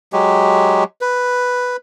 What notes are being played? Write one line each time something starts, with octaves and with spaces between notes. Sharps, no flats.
F#3 G#3 G4
B4